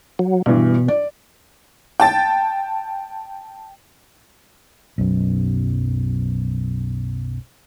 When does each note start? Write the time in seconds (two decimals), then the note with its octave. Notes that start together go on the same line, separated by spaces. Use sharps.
0.19 F#3
0.46 G2 B2 E3
0.88 D5
2.00 G5 A5 A6
4.98 B1 F#2